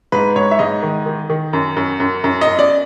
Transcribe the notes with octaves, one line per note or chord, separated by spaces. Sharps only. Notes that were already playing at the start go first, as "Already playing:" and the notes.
G#2 B4
G#2 C#5
E5
G#2 D#5
D#3
D#3
D#3
F#2
F#2
F#2
F#2
D#5
F#2
D5